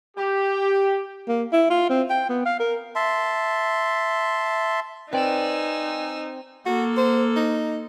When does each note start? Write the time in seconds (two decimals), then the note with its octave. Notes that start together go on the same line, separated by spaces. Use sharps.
0.17 G4
1.28 A#3
1.52 E4
1.70 F4
1.89 C4
2.10 G5
2.29 B3
2.46 F5
2.60 A#4
2.95 E5 A5 C6
5.13 C4 D#4 B4 D5 G#5 E6
6.66 A#3 F#4 A4
6.97 C5
7.36 D#4